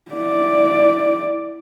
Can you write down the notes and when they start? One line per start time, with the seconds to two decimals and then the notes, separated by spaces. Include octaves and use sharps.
0.12 E4 D5